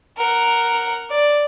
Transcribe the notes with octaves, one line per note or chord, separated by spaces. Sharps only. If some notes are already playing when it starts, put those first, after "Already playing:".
A#4 F#5
D5